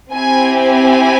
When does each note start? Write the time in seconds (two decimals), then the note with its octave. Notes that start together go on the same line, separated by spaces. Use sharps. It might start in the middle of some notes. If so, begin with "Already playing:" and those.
0.12 C4 E4 G4 G#5
0.59 G#5